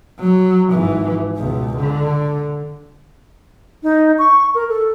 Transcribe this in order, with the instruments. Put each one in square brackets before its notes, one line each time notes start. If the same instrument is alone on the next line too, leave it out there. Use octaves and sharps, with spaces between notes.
[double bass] F#3
G#1 E3
C#2 B2
D3
[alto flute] D#4
C#6
A#4
A4